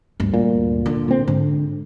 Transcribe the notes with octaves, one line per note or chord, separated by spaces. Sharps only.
D2 G2
A#2
D3
A#2 C4
G#2 D3